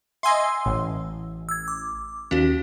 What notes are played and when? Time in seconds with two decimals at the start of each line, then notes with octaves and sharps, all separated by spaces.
0.23 D#5 E5 F#5 G#5 C6 E6
0.66 A1
1.49 E6 G#6
1.68 D6
2.31 D#2 C#4 F#4